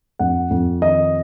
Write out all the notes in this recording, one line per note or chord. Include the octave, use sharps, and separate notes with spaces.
F2 F#5
F2
D#3 D#5